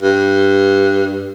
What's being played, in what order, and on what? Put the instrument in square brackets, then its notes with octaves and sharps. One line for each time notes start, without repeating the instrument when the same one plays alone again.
[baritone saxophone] G2